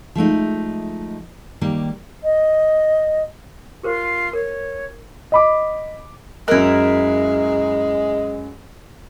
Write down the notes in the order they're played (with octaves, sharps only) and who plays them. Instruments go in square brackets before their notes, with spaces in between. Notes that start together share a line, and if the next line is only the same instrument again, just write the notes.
[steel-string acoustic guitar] F3 G#3 A3 D#4
D#3 G3 A#3
[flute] D#5
[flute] F4 [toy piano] G4 A#4 C5
[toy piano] A#4 [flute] C#5
[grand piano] D#5 B5 D6
[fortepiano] F#2 F#6 [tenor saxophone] G#3 [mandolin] E4 A#4